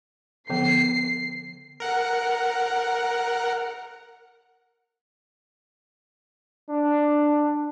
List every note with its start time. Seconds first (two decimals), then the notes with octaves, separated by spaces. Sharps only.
0.49 D3 F3 B3 C7
1.80 A#4 F#5
6.69 D4